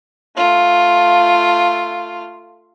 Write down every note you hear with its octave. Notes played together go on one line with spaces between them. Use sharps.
A3 F4